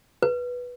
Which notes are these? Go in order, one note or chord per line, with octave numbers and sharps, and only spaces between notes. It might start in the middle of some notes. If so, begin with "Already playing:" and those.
B4